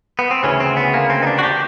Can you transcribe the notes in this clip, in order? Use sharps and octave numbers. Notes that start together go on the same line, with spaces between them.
B3
C4
D2 C#3 E3 C#4
C4
B3
A#3
C4
D#4
D4
F#4
G4